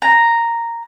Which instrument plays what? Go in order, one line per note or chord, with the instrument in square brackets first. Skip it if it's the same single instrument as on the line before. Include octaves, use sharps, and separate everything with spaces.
[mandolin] A#5